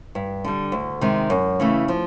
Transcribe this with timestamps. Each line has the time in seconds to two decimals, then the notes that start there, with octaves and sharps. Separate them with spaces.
0.15 G2
0.44 D3 G3
0.72 D2
1.01 C3 D#3 G#3
1.30 F#2
1.60 C#3 E3 A3
1.88 F3